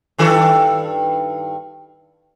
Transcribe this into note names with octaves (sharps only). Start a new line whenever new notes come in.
G2 D#3 A4